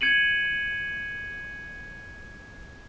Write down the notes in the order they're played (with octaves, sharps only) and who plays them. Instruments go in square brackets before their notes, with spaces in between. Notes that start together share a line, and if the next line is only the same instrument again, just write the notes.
[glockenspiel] G#6 C#7 D#7 F#7